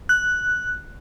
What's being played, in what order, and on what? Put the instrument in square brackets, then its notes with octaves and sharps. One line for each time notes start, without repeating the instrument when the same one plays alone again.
[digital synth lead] F#6